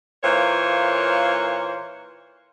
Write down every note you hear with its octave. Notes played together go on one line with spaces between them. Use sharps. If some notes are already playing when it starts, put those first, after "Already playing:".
A#2 E3 A#3 C5 C#5